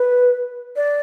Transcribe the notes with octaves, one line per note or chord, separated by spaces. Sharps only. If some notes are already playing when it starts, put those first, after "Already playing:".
Already playing: B4
D5